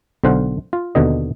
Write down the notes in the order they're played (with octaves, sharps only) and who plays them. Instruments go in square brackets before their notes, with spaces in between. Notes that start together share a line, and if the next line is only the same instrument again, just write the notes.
[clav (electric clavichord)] B1 D3 C5 F5 F#5
F4
D#2 B2 D3 D#5